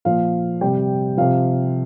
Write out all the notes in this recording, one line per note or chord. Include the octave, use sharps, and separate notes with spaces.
A#2 F3 F5
C3 G3 G5
C3 F3 F5